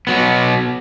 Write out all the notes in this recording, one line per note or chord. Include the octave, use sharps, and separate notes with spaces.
B2 F#3 B3